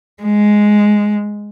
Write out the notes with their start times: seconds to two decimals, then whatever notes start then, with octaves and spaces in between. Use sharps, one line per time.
0.23 G#3